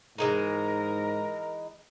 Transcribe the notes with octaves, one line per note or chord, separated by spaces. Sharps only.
G#2 E3 G#3 D#4 A#4